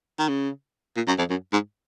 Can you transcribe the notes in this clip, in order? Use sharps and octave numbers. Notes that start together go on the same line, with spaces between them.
D#3
C#3
A#2
F#2
F2
F#2
G#2